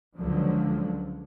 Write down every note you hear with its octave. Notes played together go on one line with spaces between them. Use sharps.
C#2 D3 F3 F#3